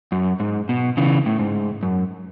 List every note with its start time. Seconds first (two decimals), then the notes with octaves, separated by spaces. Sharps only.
0.12 F#2
0.40 G#2
0.69 B2
0.97 C#3 E3
1.26 A2
1.39 G#2
1.83 F#2